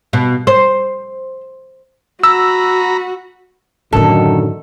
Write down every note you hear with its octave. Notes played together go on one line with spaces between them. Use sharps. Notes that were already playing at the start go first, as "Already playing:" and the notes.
B2
C5
F#4 A#5 B5 E6
F#2 A2 D3 D#3 F#3 A4